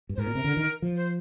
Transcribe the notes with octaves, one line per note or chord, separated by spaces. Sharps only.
G2
G#2 A#4 C5
A#2
C3
D3
D#3
F3
C5